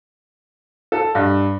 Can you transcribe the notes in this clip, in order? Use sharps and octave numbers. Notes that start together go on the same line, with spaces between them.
A4
G2